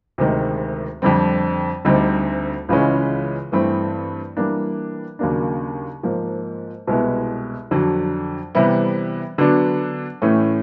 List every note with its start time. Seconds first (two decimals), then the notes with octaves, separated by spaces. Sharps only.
0.18 D2 C3 D#3 G#3
1.02 F2 D3 G3 C4
1.85 D2 D3 G3 C4 D#4
2.69 C#2 C#3 E3 G#3 C#4
3.52 G2 E3 A3 C4 E4
4.37 E3 G3 A#3 D4
5.19 D#2 C#3 F#3 A#3 D4
6.03 G#2 F3 A#3
6.87 C2 B2 G#3 B3 E4
7.71 F2 D3 F#3
8.55 C3 E3 G3 B3 E4
9.38 D3 F#3 B3 D4
10.22 A2 E3 A3 C#4